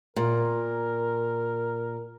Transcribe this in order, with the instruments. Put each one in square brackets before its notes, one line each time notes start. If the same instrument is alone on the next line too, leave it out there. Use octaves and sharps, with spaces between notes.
[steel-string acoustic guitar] A#2 [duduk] A#4